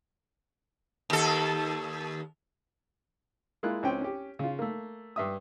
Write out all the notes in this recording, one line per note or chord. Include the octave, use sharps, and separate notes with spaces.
D#2 A4
G#3 A#3 E4 F4 F#6
C#2 C4 C#4 G5
C#4 G4
C#3 F4
A3 A#3
G2 E5 D#6